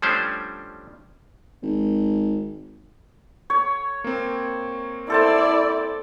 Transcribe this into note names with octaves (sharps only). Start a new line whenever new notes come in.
F3 G3 A3 C#4 D4 C5
G#1
C#5
A#3 C4
E4 A4 C5 D5 A5